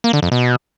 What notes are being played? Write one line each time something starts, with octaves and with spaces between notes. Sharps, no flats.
A#3
D3
F2
B2